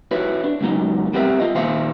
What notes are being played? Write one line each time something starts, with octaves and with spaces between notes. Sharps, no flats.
E4 F#4 B4 C#5
D4
C#2 F#2 F#3 B3 D#4
G3 B3 C4 E4 A#4 E5
F4 D#5
A#2 D#3 C5 E5 F5 C6